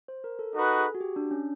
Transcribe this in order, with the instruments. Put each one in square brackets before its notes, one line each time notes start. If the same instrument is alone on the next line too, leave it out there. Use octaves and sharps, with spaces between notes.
[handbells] C5
A#4
A4
[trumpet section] D#4 F#4 B4 [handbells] A4
[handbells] G#4
F#4
G4
D4
C#4